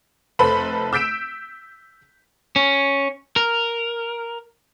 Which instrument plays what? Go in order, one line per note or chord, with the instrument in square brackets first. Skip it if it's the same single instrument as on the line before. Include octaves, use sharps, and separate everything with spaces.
[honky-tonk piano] F1 A4 B4 C5 B5
E6 G6 B6 D7 E7
[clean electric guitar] C#4
A#4